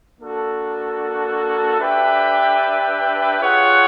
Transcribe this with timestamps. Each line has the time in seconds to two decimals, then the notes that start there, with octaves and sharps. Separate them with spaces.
0.20 A#3 D4 F#4 A4
1.79 D4 G4 B4 E5 G5
3.40 F4 G#4 C#5 F#5